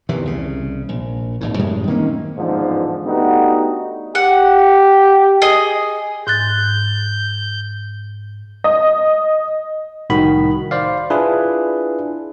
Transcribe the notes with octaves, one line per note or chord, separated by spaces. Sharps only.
E2 C3 D#3 E3
C2 C#3
A#1
G#1 D#2 A2
F#2 A2 G3 G#3
D#3 A#3 C4 C#4
A1 E2 G#2 D3 F3
A3 B3 D4 D#4 F#4 G4
G4 F#5
G#4 D#5
G#2 F#6 G6 A6
D#5
C2 A2 D#3 F#4 B5
C5 D5 F5
D4 E4 F4 G#4 B4